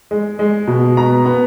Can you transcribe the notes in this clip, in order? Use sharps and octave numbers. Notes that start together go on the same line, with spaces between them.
G#3
G#3
B2
B3 A#5
B3